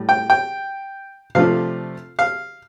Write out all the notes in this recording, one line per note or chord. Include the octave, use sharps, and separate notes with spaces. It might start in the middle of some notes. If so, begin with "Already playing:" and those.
Already playing: A2 G3
G5
G5
C3 F3 A3 D4 F4 F5
F5